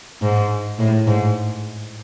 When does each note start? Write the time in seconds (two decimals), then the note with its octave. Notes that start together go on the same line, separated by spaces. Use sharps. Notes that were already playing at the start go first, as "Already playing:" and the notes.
0.22 G#2
0.79 A2
1.07 G#2